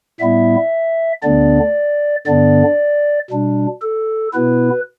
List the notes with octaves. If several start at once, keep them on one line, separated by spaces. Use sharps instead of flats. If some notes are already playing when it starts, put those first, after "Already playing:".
A2 G3 B3 E4 E5
D2 D3 B3 D4 D5
G2 D3 B3 D4 D5
B2 G3 D4
A4
B2 B3 E4 B4